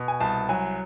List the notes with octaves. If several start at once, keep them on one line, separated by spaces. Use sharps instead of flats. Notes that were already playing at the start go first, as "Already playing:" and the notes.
Already playing: B2
G#5
C2 A5
F#3 G#5